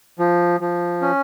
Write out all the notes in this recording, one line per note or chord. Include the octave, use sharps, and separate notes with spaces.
F3
F3
C#4